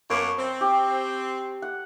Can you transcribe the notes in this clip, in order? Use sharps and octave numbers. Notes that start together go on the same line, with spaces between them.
F#2 A#3 B3 A5 C#6
C4
G4
F#5